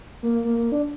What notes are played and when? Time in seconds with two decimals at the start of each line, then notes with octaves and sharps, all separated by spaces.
0.23 A#3
0.45 A#3
0.58 A#3
0.72 D4